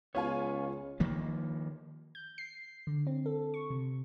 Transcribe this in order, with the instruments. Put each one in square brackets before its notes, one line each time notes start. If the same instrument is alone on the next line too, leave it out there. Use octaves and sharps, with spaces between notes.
[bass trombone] C#2 [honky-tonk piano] B3 F4 G#5 [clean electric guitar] C#5
[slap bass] D#3 F3 A#3
[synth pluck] G6
C7
D3
C4
A4
C#6
C3